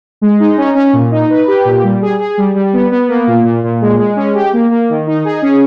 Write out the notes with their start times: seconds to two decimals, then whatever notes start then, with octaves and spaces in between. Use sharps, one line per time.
0.21 G#3
0.40 D#4
0.57 C#4
0.75 C#4
0.93 A#2
1.11 D#4
1.30 B4
1.47 G4
1.65 A#2
1.83 G3
2.02 G#4
2.20 G#4
2.37 G3
2.55 G3
2.73 B3
2.92 B3
3.08 A#3
3.27 A#2
3.44 A#2
3.63 A#2
3.81 G#3
3.99 G#3
4.16 C#4
4.34 G4
4.53 A#3
4.71 A#3
4.89 D#3
5.07 D#4
5.25 G#4
5.42 C#4